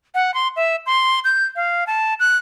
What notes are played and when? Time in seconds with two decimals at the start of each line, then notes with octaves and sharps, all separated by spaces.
0.15 F#5
0.34 C6
0.56 E5
0.86 C6
1.24 G6
1.56 F5
1.87 A5
2.20 F#6